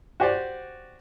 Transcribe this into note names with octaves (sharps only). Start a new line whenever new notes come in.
F#4 G4 C5 D5